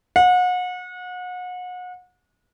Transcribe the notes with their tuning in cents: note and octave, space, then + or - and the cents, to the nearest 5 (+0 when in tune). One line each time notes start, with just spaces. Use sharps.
F#5 -35